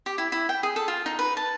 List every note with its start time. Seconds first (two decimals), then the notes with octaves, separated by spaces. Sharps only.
0.06 G4
0.18 E4
0.32 E4
0.49 G5
0.63 G#4
0.76 A4
0.88 F4
1.06 D#4
1.19 B4
1.37 A5